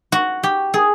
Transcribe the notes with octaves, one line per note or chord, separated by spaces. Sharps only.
F#4
G4
G#4